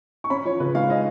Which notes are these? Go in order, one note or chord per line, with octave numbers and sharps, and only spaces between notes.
C#6
C#4 B5
F3 C#5
C#3 B4
G#3 F5
C#4 D#5